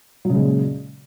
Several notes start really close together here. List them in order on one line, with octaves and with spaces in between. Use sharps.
F#3 C#3 G#3 A#2